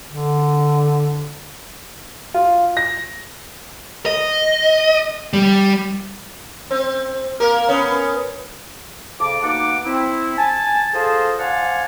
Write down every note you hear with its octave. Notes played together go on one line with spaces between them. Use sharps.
D3
F4
A#6
D#5
G3
C4
A#3 A#4
B3 C#4
F2 C#3 A5 D6
B2 A#3 D#4 F#5 D6
C4 E4
G#5 A5
F4 G#4 A4 C5 D#5 A5
C5 D5 F5 F#5 G#5 A5